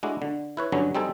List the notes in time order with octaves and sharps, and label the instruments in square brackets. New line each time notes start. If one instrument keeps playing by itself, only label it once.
[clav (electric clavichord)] G#3 A3 D4 E4 F#4
D3
E4 B4 C#5
G2 D3 F#3 C#4
G3 C4 D#4 G#4 A4